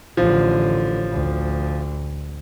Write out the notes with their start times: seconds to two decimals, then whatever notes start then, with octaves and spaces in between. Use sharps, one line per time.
0.17 A1 D3 F3
1.12 D2